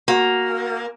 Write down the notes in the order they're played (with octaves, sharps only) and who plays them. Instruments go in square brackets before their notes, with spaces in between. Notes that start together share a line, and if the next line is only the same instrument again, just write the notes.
[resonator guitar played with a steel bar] A#3 [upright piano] F#4